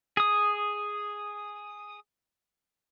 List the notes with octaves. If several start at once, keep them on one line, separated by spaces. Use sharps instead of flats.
G#4 D#6